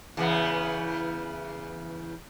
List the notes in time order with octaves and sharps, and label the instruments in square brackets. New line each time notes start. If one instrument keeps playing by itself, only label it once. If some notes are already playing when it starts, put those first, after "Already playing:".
[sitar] E2 C#3 B3